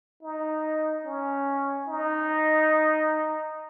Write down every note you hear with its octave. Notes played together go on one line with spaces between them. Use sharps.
D#4
C#4
D#4